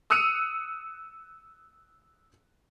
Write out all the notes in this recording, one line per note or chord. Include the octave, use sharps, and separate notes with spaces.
D#6 E6 F#6 C#7 D#7 F7